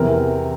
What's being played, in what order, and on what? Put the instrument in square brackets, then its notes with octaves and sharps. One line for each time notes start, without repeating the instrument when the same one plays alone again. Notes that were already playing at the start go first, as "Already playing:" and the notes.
Already playing: [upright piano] E2 C3 E3 A#4